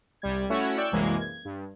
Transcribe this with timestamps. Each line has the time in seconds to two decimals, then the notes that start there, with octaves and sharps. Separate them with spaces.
0.22 C2 G3 G#6
0.50 A3 C#4 E4 F#4 C#5
0.78 D5 G5 C#6 E6 F#6
0.92 C2 F#2 E3 G#3 A#3 G#6
1.21 G#6
1.45 G2